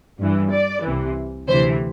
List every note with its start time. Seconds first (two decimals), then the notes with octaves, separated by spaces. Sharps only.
0.19 G2 E3
0.52 D5
0.83 C2 C3 E3
1.48 D2 C3 E3 C5